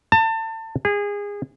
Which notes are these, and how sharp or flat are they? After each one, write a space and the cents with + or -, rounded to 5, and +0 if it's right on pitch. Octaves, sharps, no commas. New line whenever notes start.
A5 +30
G#4 -25